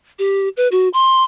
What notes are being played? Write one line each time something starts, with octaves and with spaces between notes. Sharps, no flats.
G4
B4
F#4
C6